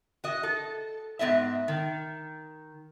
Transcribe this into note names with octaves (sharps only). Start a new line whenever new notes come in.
F#4 D#5
A4
G#2 B3 D#5 E5
D#3